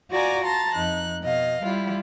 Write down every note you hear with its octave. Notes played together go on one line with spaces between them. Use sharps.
F4 F#4 D5 G#5 A#5 D6
A5 A#5 C6 A6
F2 D#4 F#6
B2 D#5 F5
G3 E4 F4